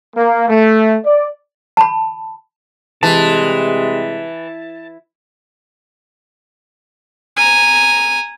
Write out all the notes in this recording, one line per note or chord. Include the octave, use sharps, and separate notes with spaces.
A#3
A3
D5
A5 B5
C3 E3 G3 G#3 A5
G#5 A#5